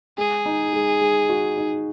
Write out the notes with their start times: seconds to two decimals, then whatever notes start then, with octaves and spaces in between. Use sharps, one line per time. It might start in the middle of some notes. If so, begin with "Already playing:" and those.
0.18 G#3 G#4
0.46 D#4
0.73 G#3
1.01 G#3
1.29 F#4
1.57 D#4